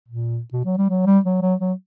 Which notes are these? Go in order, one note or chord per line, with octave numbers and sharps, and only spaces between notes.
A#2
B2
F#3
G3
F#3
G3
F#3
F#3
F#3